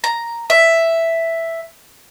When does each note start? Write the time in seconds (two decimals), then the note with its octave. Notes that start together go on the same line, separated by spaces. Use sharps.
0.04 A#5
0.50 E5